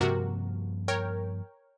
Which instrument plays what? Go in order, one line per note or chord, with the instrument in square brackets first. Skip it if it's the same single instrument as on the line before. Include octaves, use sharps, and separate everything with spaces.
[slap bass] G2 F3 A#3 [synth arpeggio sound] C3 F#4 A#4
[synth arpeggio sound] A#4 C#5 G5